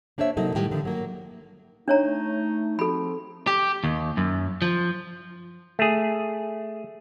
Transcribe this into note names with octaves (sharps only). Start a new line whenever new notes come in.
A#3 D4 C5 C#5 E5
C3 F#3 A#3 D#4 A4
A2 D#3 G3 G5
D3 D#3 F3
F#3 A#3
A3 D4 D#4 C#5 A#5
F3 C4 F#4 A4 B5
G4
D#2
F#2
F3
A3 G#4